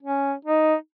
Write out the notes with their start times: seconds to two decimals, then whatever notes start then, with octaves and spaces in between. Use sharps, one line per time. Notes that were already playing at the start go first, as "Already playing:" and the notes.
0.03 C#4
0.45 D#4